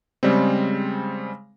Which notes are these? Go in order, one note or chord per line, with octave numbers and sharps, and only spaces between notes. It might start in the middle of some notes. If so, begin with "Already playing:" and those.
C#3 G3 G#3 C4